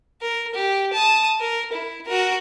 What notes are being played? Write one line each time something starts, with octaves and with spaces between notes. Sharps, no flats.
A#4
G4
A5 D#6
A#4
E4
F#4 A#4